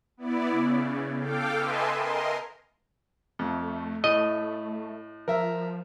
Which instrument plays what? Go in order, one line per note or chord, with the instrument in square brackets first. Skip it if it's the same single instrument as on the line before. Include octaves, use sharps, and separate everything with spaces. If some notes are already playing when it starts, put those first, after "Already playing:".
[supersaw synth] B3 E4 D5
C#3
A4 F5 G5 D6
B4 D#5 E5 G#5 A5 C6
A#4 D#5 C6
[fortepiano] F2 [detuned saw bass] A3
[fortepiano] A2 [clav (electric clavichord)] D#5
[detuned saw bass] F3 [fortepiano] A#4 E5